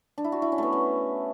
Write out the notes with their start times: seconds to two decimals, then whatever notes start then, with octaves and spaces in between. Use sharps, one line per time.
0.18 D4
0.24 E4
0.32 F#4
0.42 E4
0.52 C#4
0.58 A3 B3
0.72 C#4